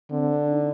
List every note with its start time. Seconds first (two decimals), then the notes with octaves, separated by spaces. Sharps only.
0.11 D3 C4
0.33 D4
0.53 D#4